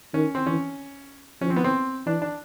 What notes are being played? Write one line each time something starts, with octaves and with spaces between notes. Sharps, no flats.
D#3 C#4
C4
E3 C#4
F3 C#4
C4
B3
C4
E3 D4
D4